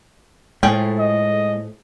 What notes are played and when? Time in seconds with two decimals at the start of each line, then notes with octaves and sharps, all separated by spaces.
0.63 A2 F3 G#3 A3 G#4 G5
0.99 D#5